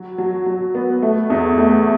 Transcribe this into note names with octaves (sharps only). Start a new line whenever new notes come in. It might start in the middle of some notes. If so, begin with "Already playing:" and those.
Already playing: F#3
F#3
F#3
B3
A3
E2
A3